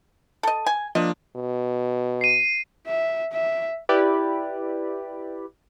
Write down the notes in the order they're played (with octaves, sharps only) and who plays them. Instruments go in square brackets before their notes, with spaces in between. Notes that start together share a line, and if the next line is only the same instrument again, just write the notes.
[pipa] A4 D#5
G#5
[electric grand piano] F3 A#3 D4 [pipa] D#5
[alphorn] B2
[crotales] C7 D#7
[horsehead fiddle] E5
E5
[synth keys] E4 G4 B4 D5